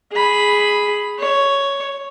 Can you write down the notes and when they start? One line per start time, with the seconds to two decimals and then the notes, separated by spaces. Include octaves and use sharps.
0.12 G#4 B5
1.19 C#5